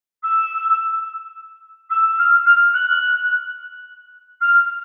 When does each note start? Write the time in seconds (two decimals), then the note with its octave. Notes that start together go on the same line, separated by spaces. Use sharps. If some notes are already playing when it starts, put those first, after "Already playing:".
0.23 E6
1.89 E6
2.18 F6
2.45 F6
2.73 F#6
4.41 F6